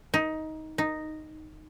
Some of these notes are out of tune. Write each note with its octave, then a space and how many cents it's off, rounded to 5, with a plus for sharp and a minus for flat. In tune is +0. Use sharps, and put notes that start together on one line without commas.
D#4 +15
D#4 -5